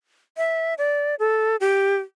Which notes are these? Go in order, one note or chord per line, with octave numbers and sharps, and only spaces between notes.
E5
D5
A4
G4